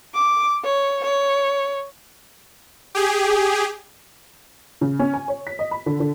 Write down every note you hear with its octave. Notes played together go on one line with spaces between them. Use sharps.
D6
C#5
C#5
G4 G#4
C#3
C#4
G#5
C#5
B6
D#5
B5
D3
D3